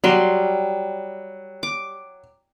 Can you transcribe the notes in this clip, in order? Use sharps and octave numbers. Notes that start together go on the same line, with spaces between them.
F#3 G3 C6
D6